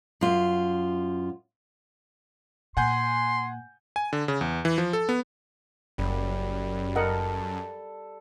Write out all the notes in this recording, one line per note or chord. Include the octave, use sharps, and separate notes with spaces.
F#2 F4
A#2 F#5 G#5 C6 G6
G#5
D3
C#3
E2
E3
F3
A4
B3
F#1 F#2 G3
A4 A#4 D#5 F#5